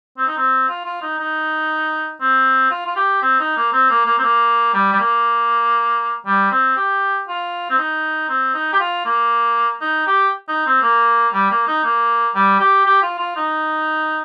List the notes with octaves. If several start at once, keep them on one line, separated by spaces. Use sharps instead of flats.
C4
D#4
C4
F4
F4
D#4
D#4
C4
F4
F4
G4
C4
D#4
A#3
C4
A#3
A#3
C4
A#3
G3
G3
A#3
G3
C4
G4
F4
C4
D#4
C4
D#4
G4
F4
A#3
D#4
G4
D#4
C4
A#3
G3
A#3
D#4
A#3
G3
G4
G4
F4
F4
D#4